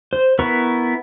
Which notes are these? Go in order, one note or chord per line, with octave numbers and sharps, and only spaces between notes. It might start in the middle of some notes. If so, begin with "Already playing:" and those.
C5
B3 E4 A#4 B4 C#6